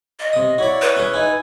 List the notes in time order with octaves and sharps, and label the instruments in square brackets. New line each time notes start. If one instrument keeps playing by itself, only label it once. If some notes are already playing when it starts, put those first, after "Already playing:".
[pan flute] D#5
[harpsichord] C3 D#6
[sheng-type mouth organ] E4 C#5 [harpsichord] F#4 D5
[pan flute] B4
[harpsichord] C#4 G#4
[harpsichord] D#4 E4 [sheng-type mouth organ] G#5